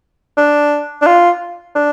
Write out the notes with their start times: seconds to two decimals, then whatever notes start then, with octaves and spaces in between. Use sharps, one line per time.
0.37 D4
1.02 D4
1.06 F4
1.76 D4